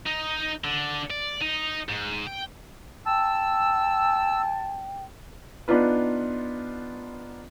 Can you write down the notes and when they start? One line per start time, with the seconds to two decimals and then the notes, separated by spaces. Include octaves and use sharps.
0.06 D#4
0.64 D3
1.10 D5
1.41 D#4
1.89 G#2
2.27 G5
3.06 G5 A5 E6
5.68 B3 D4 D#4 F4 B4